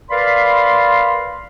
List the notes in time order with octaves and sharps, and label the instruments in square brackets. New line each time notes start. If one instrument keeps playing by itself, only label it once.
[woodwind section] A#4 B4 D5 F5 B5 C6